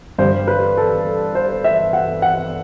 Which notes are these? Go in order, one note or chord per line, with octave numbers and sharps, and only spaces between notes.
G2 D3 C5
B4
A4
C5
E5
F#5
F#5